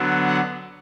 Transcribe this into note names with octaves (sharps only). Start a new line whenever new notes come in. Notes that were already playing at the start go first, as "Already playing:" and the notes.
Already playing: D3 F#3 B3 D4
F#5